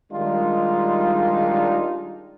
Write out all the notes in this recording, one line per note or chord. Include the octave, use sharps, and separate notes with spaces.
D#3 G3 G#3 D4 D#4 F4